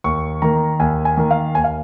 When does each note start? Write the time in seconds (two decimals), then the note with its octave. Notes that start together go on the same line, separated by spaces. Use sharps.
0.04 D#2 C#6
0.42 D#3 A#3 A#5
0.80 D#2 G#5
1.05 G#5
1.17 D#3 A#3
1.31 F5
1.55 D#2 G#5
1.64 F5